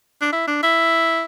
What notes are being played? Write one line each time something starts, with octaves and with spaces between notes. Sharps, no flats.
D4
E4
D4
E4